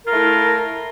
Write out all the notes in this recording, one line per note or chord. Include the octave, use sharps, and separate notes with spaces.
A3 E4 F4 A#4